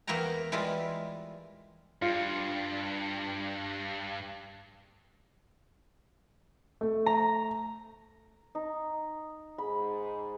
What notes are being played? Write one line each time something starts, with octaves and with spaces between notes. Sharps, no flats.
E2 A#3 B3 E4 G5 A#5
E3 G3 G#3 E4 F4
G2 F4
A3
A#5
D#4
G#2 G#4 B5